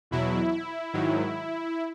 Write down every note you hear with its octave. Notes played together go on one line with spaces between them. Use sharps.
E2 B2 F#3 E4
G#2 D#3 F#3